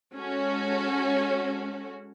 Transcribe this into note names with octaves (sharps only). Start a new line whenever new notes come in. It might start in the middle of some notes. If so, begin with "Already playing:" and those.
G#3 C#4 F#4 A4